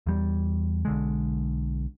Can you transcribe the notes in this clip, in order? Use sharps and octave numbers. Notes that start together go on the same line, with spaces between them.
E2 G3
B1 D3 G#3